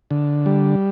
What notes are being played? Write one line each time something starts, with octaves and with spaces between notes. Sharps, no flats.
D3
G3